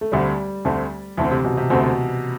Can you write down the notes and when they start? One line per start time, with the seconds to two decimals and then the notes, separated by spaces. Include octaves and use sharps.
0.01 A3
0.12 D2 D3 G3 A3 C4
0.65 D2 D3 A3 C4
1.17 D2 D3 E3 A3 C4
1.31 C3
1.44 B2
1.57 C3
1.70 D2 B2 D3 A3 C4